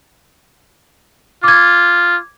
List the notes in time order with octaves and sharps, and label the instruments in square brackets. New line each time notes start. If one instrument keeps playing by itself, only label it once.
[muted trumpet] F4 [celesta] D6 G#6